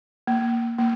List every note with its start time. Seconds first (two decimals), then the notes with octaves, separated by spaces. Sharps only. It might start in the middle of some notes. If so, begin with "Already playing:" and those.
0.27 A#3
0.78 A#3